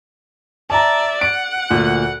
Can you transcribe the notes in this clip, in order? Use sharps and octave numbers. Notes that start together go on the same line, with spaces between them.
D5 E5 A5 A#5
F#5 D7
D2 A#2